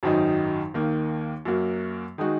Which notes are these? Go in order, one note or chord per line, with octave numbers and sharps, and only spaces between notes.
G#1 F#2 D#3 F#3 D#4
D#2 D#3 A#3
F#2 F#3 A#3 F#4
D#3 G#3 D#4 F#4